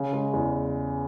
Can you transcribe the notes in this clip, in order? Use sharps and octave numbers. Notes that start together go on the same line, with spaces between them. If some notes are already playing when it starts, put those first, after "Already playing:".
Already playing: C#3
G#3
E2